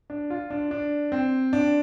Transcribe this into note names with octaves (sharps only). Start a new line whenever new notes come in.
D4
F4
D4
D4
C4
D4